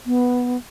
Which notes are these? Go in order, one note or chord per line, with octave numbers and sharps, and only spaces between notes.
B3